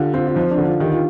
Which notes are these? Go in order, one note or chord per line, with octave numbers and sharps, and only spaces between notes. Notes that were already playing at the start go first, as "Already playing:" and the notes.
Already playing: D3 F4 G4
C4 F4
F4
F3 D#4
D4
D3
F4
D#3 G4
F4